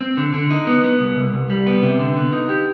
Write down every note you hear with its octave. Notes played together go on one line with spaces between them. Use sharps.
C4
D3
D3
D#4
B3
B3
C2
C2
C2
G3
B3
C3
D3
B3
D#4
G4